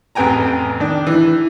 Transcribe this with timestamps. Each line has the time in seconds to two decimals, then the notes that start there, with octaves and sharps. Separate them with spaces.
0.15 A1 F2 B3 G5 G#5 A#5
0.80 D#3 D4
1.07 E3